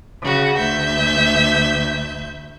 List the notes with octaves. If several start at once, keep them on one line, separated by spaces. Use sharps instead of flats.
C#3 F#4
D2 E5 G6